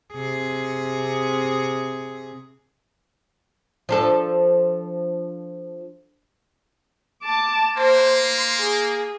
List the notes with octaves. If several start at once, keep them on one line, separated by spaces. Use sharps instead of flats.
C3 G#4
F3 D4 A4
A5 D6
A#3 C5
C6
G#4